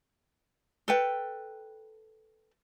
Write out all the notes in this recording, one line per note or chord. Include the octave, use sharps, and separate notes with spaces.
A4 B4 G5